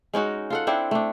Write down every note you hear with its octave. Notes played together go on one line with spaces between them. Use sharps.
G#3 C#4 D#4 F#4
F4 A4 F#5
C4 D4 E4 C5
A3 D4